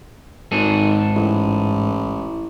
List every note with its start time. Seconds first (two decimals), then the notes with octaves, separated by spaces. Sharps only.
0.52 G#1 G#2 G#4 A4
1.15 A1